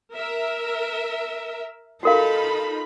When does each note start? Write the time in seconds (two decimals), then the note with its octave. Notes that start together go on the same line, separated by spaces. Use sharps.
0.12 A#4 E5
2.03 D#4 F4 F#4 A4 A#4 F5 B5